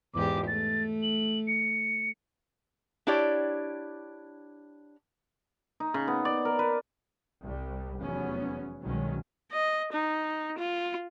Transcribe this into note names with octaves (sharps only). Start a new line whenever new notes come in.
E2 G#2 G4 D6
A3 A6
F#7
C#7
D4 E4 G4 C#5 D5
D#4
C#3
B3
D5
A#4
B4
C2 G3
F1 E2 F#3 B3 C#4
C2 B2 D#3 F#3 G#3 C#4
D#5
D#4
F4